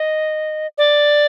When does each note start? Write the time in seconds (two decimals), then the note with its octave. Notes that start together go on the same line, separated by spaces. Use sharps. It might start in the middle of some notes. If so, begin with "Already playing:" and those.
Already playing: D#5
0.78 D5